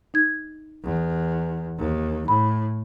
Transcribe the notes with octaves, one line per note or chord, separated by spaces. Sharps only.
D#4 G#6
E2
D#2
A2 B5